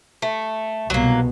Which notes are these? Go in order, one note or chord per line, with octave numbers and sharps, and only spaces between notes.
A3
C2 B2 F#3 A#3